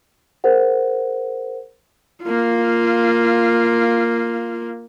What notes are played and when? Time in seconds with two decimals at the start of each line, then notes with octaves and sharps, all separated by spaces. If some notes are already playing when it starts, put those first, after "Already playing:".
0.44 G#4 A#4 C5 F#5
2.23 A#3 F4